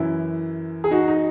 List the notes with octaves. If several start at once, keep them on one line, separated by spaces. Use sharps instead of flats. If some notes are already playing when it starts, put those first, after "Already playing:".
Already playing: F#2 E3 E4
G#4
D#4 F#4
D#4